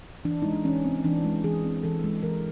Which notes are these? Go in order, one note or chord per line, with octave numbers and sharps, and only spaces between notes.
E3 D4
G#3 D#4
D4
E3 C#4
C4
E3 D4
G#3
E3 G#4
C4
E3 A4
G#3
E3 A#4